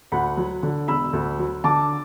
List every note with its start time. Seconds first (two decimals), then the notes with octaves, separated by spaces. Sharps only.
0.12 D2 F#5 B5
0.37 F#3
0.63 D3
0.88 E1 B5 E6
1.13 D2
1.38 F#3
1.64 D3 A5 D6